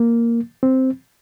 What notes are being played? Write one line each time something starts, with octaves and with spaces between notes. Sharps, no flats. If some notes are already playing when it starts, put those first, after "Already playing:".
Already playing: A#3
C4